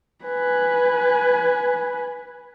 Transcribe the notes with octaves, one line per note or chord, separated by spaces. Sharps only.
B4 G#5